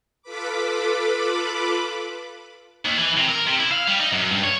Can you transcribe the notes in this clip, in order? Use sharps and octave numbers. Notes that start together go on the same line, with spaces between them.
F4 A4 B4 B5 D6
D#2
E3
C3
A#4
C3
E4
F5
G3
D#4
F#2
G2
C#5